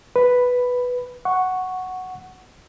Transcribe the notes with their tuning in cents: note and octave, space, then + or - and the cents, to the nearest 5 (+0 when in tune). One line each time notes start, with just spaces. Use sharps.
B4 +0 B5 +5
F#5 +0 C#6 +0